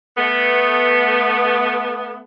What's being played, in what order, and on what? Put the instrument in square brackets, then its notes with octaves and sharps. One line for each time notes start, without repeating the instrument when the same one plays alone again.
[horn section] A3 B3